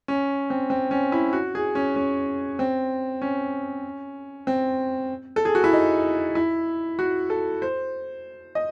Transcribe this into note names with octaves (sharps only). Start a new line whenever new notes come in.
C#4
C4
C4
C#4
E4
F#4
G#4
C#4
C#4
C4
C#4
C4
A4
G#4
F#4
E4
D#4
E4
F#4
A4
C5
D#5